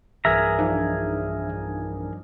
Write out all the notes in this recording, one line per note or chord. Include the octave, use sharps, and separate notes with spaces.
B1 G2 E3 G#4 A#4 E5 A#5
F3 D4 D#4